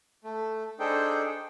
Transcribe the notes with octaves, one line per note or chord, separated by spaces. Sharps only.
A3
D4 D#4 G#4 A4 C5 G5